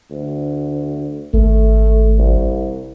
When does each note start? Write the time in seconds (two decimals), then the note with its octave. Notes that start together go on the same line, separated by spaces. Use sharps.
0.10 D2
1.34 G#1 A3
2.18 C2